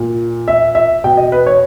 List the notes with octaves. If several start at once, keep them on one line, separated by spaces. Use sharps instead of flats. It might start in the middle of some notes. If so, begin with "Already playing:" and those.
Already playing: A#2
E5
E5
B2 G5
D#5
B4
C#5